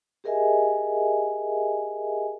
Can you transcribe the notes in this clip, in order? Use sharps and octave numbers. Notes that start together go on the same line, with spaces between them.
G4 G#4 A#4 D#5 E5 G#5